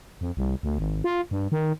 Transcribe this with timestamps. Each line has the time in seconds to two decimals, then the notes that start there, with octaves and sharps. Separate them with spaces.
0.21 F2
0.37 C2
0.63 D2
0.78 G#1
1.04 F4
1.31 G2
1.52 D#3